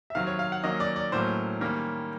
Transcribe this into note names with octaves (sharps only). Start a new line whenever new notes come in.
E5
C3 D#3 F#3 F5
C#5
F5
F#5
D#3 F#3 A#3 C#4 D#5
D5
D5
A2 F#3 A#3 C#4 C5
D#3 G3 A#3 C#4